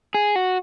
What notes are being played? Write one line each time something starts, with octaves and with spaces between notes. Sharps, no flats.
G#4
F#4